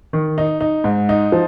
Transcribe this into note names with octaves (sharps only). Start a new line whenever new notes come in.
D#3
D#4
D#4
G#2
D#4
F3